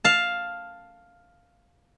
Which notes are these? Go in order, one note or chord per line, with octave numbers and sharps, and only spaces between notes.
F5 A5